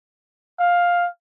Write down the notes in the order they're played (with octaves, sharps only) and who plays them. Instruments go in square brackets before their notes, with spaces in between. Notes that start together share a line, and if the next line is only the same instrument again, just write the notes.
[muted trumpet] F5